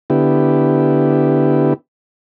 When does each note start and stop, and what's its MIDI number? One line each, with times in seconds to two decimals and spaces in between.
0.10 1.74 50
0.10 1.74 59
0.10 1.74 64
0.10 1.74 67